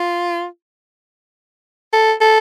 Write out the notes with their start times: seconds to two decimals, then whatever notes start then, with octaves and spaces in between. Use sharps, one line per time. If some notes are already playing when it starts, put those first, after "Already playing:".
Already playing: F4
1.93 A4
2.21 A4